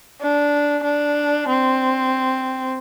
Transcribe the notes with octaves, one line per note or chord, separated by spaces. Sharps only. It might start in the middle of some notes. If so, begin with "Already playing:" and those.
D4
D4
C4